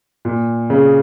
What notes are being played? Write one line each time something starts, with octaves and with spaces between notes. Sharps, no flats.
A#2
C#3